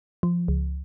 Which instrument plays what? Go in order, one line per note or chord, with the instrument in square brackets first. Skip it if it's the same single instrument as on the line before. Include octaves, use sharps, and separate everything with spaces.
[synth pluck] F3
C#2